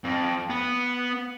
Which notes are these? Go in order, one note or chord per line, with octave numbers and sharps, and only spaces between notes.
F2
B3